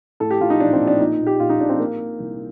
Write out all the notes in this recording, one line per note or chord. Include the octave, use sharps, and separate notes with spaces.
A2 A4
G4
A2 F4
D#4
A#1 D4
C4
A#1
D4
A#2 D#4
A#2
G4
A#1 F4
D#4
A#1 D4
C4
A#2 A#3
A#2
C2